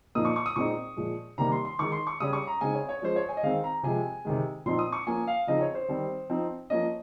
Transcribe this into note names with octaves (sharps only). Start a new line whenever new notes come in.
A#2 F3 A#3 D#4 D#6
C#6
C#6
D#6
A#2 G#3 C4 D#4 C#6
A#2 F3 G#3
C3 D#3 G3 A#3 A#5
C6
C6
D#3 G#3 D#4 C#6
C6
C#6
C#3 G3 C#4 D#6
C#6
A#5
C#3 G#3 C4 D#4 G#5
C#5
C#5
F3 G#3 C#4 C5
C#5
G#5
D#5
D#3 G#3 C4 F5
A#5
C3 F3 G#3 G#5
C3 D#3 G#3
A#2 F3 C4 D#4 C6
D#6
C#6
F3 A#3 C#4 G#5
F5
C#3 F3 C4 D#4 D#5
C#5
C5
D#3 G3 C4
F3 C4 D#4
F3 A#3 C#4 D#5